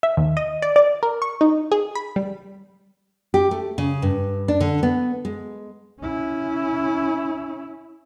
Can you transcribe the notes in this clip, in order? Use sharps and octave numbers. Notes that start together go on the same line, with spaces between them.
E5
D#2
D#5
D5
D5
A#4
C#6
D#4
G#4
B5
G3
G4
A3
C#3
G2
D4
D3
B3
G#3
C#4 E4